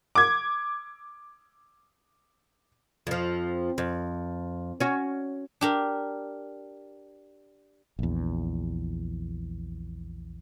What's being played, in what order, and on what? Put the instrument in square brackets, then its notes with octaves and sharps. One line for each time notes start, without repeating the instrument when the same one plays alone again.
[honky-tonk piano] D6 G#6
[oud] F2 F3
F2
C#4 F#4
[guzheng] D4 G4 A#4
[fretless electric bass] A#1 E2